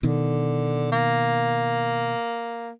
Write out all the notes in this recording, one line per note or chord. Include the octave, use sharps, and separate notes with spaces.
B2 D3 D#3
A#3